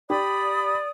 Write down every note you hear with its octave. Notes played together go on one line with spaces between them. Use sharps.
G4 D5 B5 D#6